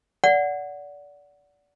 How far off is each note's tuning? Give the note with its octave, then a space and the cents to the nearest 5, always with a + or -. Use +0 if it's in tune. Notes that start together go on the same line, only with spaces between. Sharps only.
D5 -25 F#5 +0